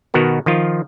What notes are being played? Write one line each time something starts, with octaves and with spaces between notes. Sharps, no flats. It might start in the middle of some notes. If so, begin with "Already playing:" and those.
B2 D#3 B3 F#4 A#4
D#3 F3 F4